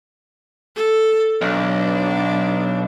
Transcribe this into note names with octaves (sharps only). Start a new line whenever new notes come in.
A4
B1 D4